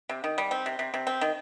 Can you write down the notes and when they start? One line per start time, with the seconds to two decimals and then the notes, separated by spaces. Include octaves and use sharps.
0.09 C3
0.24 D#3
0.38 G3
0.51 C4
0.66 C3
0.79 C3
0.94 C3
1.07 C4
1.21 D#3